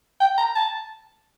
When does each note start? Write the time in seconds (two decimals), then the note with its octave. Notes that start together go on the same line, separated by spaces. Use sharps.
0.20 G5
0.38 A#5
0.55 A5